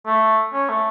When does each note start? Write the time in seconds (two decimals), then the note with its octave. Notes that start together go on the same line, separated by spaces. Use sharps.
0.06 A3
0.53 C#4
0.69 A3